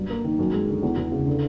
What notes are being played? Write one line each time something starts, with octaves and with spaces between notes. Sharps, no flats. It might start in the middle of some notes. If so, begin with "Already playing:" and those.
Already playing: G2 F#3
A#3
D#3
F#2
G#3
D3
E2
E2
C#3
D3